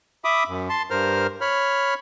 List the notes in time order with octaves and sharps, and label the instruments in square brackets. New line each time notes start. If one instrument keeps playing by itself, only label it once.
[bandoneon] E5 B5 D6 D#6
F#2
A5 C6
G2 A#4 C5 F6
C#5 B5 F6